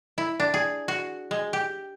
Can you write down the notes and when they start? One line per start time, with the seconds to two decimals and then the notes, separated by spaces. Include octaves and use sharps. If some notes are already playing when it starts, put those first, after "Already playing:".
0.18 E4
0.40 D4
0.54 G#4
0.88 F#4
1.31 G#3
1.53 G4